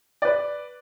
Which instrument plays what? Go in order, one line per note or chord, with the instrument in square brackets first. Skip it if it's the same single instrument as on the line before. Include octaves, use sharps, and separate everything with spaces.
[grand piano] B4 D5